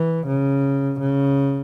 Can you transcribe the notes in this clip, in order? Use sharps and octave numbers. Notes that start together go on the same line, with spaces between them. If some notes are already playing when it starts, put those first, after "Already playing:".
Already playing: E3
C#3
C#3